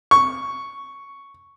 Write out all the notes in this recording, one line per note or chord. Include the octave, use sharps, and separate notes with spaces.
C#6